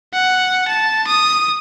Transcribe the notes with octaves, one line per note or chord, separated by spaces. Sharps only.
F#5
A5
D#6